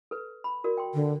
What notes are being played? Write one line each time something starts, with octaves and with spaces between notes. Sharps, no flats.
A4 B4
B5
F#4 A#4 D5
G5 C6
D3